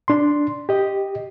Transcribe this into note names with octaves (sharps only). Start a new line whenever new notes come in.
D4 C6
G4 D#5